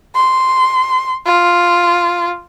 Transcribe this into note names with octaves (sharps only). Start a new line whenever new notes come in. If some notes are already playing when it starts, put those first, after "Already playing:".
C6
F4